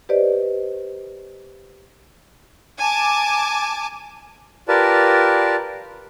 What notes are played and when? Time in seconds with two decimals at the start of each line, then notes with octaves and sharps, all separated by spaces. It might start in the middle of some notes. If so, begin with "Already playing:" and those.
0.09 G4 B4 C5 D5 D#5
2.80 G#5 A5 D6
4.68 F4 G4 A#4 B4 D5 A5